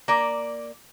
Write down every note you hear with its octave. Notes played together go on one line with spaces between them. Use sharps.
A#3 D5